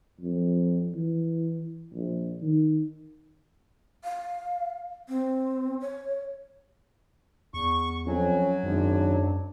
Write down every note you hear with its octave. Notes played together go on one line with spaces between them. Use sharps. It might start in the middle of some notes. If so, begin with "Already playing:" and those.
F2
E3
A#1
D#3
F5
C4
C#5
E2 C#6
F2 F#3 C#4
G#1 F#2 D4